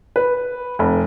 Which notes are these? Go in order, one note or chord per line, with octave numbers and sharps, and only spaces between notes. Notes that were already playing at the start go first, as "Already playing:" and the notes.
B4
F1